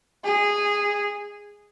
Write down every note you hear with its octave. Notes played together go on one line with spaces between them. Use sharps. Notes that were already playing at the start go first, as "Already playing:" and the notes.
G#4